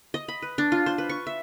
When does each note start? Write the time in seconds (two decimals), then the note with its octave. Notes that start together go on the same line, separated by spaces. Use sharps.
0.14 D#5
0.28 B5
0.42 B4
0.58 D4
0.72 F4
0.86 C5
0.98 B4
1.09 C#6
1.27 E5